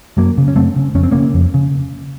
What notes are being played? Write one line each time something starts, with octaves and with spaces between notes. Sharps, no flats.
F#2 F#3 A#3
C#3
C#4
F#2 A3 C4
C#3
F2 C#4
C4
C#3 A#3 C#4
F2
C#3